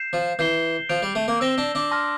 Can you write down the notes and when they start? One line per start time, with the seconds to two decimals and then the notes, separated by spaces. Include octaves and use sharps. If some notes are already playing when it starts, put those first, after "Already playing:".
Already playing: G6 C7 E7
0.13 F3
0.39 E3 G6 C7 E7 G7
0.89 F3 G6 D7 F7
1.02 G3
1.15 A3
1.28 A#3
1.40 C4 E6 A#6 E7 G7
1.58 D4
1.75 D4
1.91 A5 C6 F6 A#6